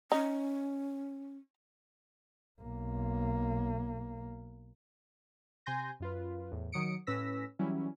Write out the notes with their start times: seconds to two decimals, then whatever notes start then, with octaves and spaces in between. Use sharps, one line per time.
0.12 C#4 D#4
2.62 B1 A#3
5.66 C3 G#5 C6 G6 A#6
6.00 F#2 F4 B4
6.52 E2 A2
6.72 D#3 F#3 D#6 C#7 D7
7.07 A2 C#4 B4 E6 A#6 B6
7.59 E3 F#3 G3 C#4 E4